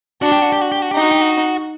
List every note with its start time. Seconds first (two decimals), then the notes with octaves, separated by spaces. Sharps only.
0.22 D4 F#4
0.32 G4
0.42 F#4
0.52 G4
0.61 F#4
0.72 G4
0.82 F#4
0.91 D#4 G4
1.01 F#4
1.11 G4
1.21 F#4